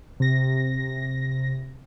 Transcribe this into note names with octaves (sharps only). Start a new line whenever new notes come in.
C3 A#6